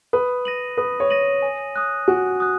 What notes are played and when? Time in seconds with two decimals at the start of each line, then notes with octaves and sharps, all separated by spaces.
0.13 B4 D#6
0.45 A#6 D#7 F#7
0.77 B4 D#6
1.00 C#5
1.10 A#6 D#7 F#7
1.42 G#5
1.76 D#6 F#6
2.08 F#4 G#5
2.40 D#6 F#6